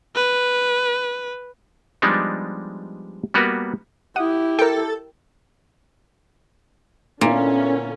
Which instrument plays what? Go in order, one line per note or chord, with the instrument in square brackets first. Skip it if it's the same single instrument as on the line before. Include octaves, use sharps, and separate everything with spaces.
[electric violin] B4
[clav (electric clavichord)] F3 G3 G#3 B3 D4 D#4
G3 A#3 B3 F#4 A#4 B4
[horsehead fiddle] E4 G4 [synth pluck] F#5 D#6
[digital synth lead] A4 [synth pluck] A#4 G5
[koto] A#2 [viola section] D3 C#4 [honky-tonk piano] A#3 B3 E4